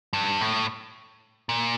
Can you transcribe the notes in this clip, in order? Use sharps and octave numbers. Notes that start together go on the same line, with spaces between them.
G2
A2
A#2